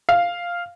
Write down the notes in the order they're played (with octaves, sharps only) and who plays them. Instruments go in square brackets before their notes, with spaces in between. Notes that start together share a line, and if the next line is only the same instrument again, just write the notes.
[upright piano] F5